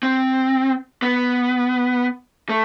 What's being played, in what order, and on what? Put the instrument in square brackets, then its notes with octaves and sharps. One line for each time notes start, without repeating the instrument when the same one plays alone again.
[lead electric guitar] C4
B3
A3